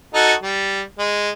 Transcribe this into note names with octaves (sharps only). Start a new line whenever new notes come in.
D#4 F#4 A4
G3
G#3